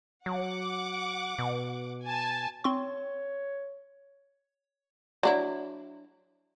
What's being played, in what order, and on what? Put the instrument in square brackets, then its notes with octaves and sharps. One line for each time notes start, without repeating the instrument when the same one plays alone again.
[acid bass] F#3 [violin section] F#5 D6
[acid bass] B2
[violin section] G#5 A5
[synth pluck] C4 C6 C#6 [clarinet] C#5
[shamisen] F#3 D4 E4